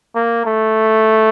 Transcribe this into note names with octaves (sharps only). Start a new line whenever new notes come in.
A#3
A3